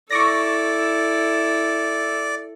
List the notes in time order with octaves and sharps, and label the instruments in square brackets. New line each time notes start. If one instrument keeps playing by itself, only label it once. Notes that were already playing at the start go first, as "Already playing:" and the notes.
[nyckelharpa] E4 A4 [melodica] D5 [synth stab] C#6 D6 A#6